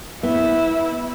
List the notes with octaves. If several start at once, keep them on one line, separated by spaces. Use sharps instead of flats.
B3 E4